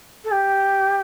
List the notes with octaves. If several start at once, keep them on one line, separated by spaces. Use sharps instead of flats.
A4
G4